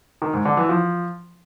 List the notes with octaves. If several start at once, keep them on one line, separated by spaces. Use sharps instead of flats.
D#3
G#2
D3
E3
F3